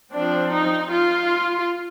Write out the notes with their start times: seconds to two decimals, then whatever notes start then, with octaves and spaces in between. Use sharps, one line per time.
0.12 F3 C4 D4
0.52 D#4
0.91 F4